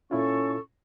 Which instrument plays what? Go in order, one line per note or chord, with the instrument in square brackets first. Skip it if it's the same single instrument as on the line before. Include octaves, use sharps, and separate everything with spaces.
[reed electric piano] A#2 E4 F4 [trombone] C#4 [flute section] A4 C#6